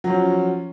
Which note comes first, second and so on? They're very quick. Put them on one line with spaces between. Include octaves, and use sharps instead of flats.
F#3 F3 C#4